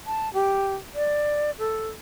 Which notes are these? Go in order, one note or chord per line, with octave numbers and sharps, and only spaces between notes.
A5
G4
D5
A4